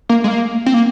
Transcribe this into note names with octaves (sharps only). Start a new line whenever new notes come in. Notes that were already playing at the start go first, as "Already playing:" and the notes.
A#3
G#3
A#3
C4
A#3